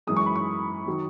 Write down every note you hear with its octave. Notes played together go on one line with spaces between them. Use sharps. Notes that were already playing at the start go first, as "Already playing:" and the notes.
F#2 E3 G#3 D#6
C#6
B5
C#6
D#3 F#3